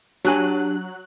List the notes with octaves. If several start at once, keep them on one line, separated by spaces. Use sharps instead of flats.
F#3 D4 G4 G#5 F#6